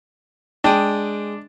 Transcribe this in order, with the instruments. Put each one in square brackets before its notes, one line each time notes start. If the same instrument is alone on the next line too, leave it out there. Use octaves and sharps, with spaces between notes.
[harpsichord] G#3 D#6 [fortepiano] D4 [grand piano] G5